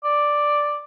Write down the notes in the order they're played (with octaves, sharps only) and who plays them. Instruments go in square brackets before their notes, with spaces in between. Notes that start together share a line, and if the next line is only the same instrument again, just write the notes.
[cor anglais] D5